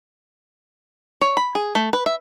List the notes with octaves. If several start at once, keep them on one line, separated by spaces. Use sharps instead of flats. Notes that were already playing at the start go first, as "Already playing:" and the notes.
C#5
B5
G#4
A3
B4
E5